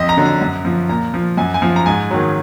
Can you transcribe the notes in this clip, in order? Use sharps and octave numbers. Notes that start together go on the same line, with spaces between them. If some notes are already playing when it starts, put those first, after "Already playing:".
Already playing: F2 D#5
A#5
D3 F#3
A#5
F#2
F3
A#2 A#5
F3
F#2 G#5
G#5
F3
A#5
G#2 G#5
D#3 F#3